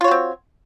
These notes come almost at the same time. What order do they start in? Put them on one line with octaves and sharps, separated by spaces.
F4 C#5 F#4 C4